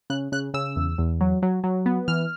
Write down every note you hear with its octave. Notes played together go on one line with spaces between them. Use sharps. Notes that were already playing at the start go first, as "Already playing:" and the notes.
C#3 F#6
C#3 F#6
C#3 E6
E2
E2
F#3
F#3
F#3
B3
E3 F6